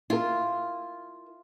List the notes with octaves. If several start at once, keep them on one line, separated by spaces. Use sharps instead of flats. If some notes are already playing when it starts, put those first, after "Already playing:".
E4 F4 A#4